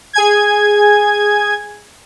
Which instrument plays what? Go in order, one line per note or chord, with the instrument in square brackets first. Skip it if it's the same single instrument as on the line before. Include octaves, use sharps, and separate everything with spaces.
[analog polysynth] G#4 G#5 G#6